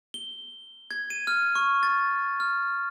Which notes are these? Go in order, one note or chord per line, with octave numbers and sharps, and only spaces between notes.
G7
G#6
D#7
F6
C#6
A6
F6